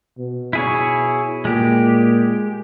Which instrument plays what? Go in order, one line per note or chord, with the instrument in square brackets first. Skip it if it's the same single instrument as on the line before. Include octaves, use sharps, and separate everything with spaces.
[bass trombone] B2
[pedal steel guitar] E4 G#4 C#5
[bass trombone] A#2 [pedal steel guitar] G#3 G4